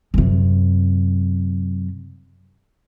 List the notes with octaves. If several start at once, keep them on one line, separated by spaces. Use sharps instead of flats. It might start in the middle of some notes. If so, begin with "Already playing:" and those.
F#2 C3